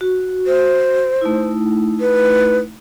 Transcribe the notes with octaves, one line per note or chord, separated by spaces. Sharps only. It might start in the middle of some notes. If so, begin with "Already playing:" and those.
F#4
C5
A3 D#4 E4
B4